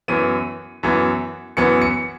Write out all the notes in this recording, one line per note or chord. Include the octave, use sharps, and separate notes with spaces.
F#2 E3 B3 D#7
F#2 E3 B3
F#2 E3 B3 C#7
C#7